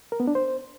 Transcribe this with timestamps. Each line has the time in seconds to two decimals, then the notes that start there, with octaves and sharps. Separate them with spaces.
0.12 A#4
0.20 B3
0.27 D4
0.35 C5